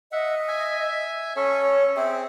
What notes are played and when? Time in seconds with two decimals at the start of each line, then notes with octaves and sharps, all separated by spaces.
0.12 D#5 E5 F#5
0.48 E5 G#5
1.36 C#4 A4 C#5
1.97 C4 G#4 E5